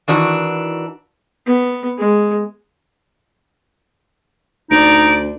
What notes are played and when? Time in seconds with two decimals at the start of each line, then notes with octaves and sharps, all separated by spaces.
0.08 D#3 E3 D4 F#4
1.46 B3
1.98 G#3
4.71 D2 D#4 D5 D7